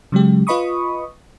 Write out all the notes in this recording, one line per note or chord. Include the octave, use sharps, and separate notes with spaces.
C#3 F#3 G#3 G4
F4 B4 D#5 B5 C#6 D#6